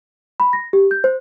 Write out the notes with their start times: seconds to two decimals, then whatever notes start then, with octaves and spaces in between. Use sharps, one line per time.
0.40 B5
0.53 A#6
0.73 G4
0.91 G6
1.04 C5